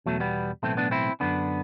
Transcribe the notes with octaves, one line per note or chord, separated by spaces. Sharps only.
E2 B2 F#3 A3
G3 B3
B1 A2 E3 A3 C4
B3 D4
C4 E4
F#2 D3 B3 D4